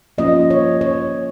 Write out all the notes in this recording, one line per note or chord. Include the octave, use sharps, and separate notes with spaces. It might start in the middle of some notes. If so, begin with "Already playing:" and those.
F3 A#3 C#4 F4 D#5
C#5
C#5